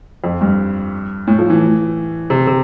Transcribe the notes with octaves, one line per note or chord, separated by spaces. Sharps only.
F2
G2
A2
F3
E3
C3
C3